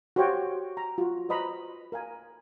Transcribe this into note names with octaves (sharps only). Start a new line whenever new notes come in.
F#4 G4 C5 C#5 F5 G5
A#5
F4 F#4
B4 C5 D#5 A#5 B5
A#4 F5 G#5